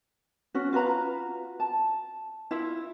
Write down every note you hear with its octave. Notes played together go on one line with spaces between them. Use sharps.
C#4 F#4
F4 F#4 B4 A#5
A5
E4 F4 E5